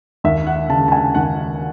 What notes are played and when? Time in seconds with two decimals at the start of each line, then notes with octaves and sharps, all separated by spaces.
0.24 D#2 E5
0.47 F#5
0.69 C#3 A5
0.88 A5
0.92 G#5
1.15 D#2 F#5